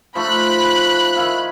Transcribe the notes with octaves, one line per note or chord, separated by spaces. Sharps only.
F3 A3 D#4 B5 F#6
D#3 E4 F5